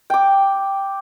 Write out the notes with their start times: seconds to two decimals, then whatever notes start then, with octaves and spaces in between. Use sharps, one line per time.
0.10 G5 D6